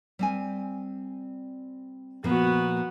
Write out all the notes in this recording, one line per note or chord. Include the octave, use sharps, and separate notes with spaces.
G3 C4 G#5
A#2 F3 A#3 B3 F#4